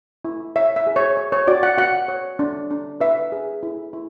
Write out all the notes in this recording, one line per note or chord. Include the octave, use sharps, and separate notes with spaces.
E4
C#5 E5
E5
G#4
C#5
C#5
C#5
F#4 D5
F#5
F#4 F#5
C#5
D4
D4
B4 E5
G#4
E4
E4